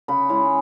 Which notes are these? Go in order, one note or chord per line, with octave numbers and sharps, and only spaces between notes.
C#3 B5
G#3 C#4 E4